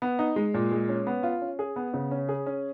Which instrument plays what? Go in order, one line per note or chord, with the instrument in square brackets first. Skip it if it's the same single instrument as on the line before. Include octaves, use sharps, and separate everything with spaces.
[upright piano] B3
D#4
G#3
A#2
G#3
C#4
B3
F4
C#4
G#4
B3
C#3
C#4
G#4
C#4